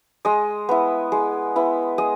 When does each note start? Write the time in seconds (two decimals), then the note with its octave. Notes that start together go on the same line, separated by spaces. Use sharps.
0.25 G#3 D#5
0.69 B3 E4
1.12 G#3
1.56 B3 E4
1.98 G#3 D#5